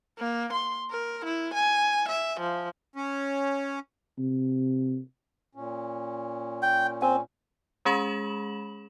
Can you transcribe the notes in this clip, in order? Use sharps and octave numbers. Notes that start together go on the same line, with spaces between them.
A#3
C6
A#4
E4
G#5
E5
F3
C#4
C3
A#2 C#4
G5
C4 G#5
G#3 C#4 G#4 B5 E7 F#7